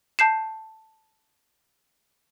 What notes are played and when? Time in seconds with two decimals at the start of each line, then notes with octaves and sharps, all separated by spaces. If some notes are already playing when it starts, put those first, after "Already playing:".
0.19 A5 G6 C7 E7